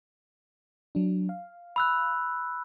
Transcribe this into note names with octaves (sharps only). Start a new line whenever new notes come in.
F#3 D4
F5
B5 E6 F#6